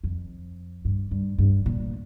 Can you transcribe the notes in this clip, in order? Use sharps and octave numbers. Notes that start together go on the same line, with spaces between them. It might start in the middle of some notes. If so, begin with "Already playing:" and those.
F2
G2
G2
G2
A#2